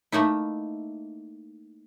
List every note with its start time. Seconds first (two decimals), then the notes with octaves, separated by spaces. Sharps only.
0.12 A3 A#3 D#4 E4